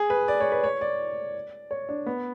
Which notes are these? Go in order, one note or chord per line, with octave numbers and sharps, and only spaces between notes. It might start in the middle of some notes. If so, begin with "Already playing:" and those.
Already playing: G#4
B4
D5
C#5
B4
C#5
D5
C#5
D4
B3